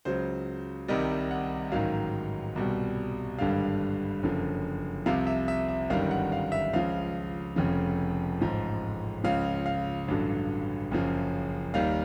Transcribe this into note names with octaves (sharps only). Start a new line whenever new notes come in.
C#2 C#3 F#3 C5
C2 C3 D#3 G3 D#5
F#5
A1 G#2 D#3 F#3 F5
C2 B2 G3
G#1 G2 D3 G3 F5
F#1 F#2 D3 F3
C2 C3 F3 F5
E5
E5
E5
G1 F#2 D#3 G3 F5
F#5
F5
E5
C#2 C#3 F3 F5
F1 F2 C#3 F3
A1 G#2 F3
C#2 C#3 F3 F5
F5
A1 G2 D3 F#3
F#1 F#2 C#3 F3
D#2 D#3 G3 F5